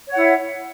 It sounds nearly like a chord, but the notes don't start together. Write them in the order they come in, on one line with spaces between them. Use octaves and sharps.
C#5 F#5 E4